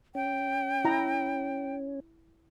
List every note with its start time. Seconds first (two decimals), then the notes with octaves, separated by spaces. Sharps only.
0.15 C#4 G5
0.85 E4 A#5